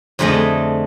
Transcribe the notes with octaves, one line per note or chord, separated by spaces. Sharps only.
F2 D3 A3 G#4 D#5